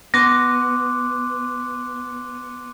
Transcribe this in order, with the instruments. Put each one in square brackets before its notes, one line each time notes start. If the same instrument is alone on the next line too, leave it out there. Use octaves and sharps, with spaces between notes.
[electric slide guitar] B3 [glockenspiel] C6 D6 F#6 [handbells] A#6